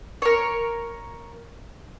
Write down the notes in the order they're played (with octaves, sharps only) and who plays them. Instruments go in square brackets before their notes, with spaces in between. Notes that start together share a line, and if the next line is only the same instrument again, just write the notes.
[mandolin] A#4 C#5